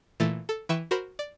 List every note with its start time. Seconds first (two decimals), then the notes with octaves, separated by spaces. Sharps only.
0.20 A#2 E3 A3 A6
0.49 A4
0.69 E3 B4 E5 G5 C#6 E7
0.91 F#4 A#4 C5 B5
1.19 D5